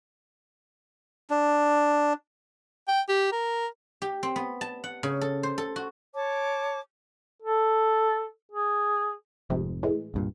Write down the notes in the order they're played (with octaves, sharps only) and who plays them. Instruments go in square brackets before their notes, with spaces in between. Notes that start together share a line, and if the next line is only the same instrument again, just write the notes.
[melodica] D4
[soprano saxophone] G5
G4
A#4
[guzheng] G4
C4
B3
A5
F#5
C#3
A4
C5
A4
F#4
[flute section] C#5 A5 D6
[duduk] A4
G#4
[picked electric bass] F1 F2 G#2 [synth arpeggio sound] C3
[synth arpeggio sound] A2 E3 G#3
[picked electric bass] C2 G2 A#2